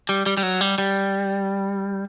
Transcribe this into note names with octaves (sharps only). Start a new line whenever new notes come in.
G3
G3
G3
F#3
G3
G3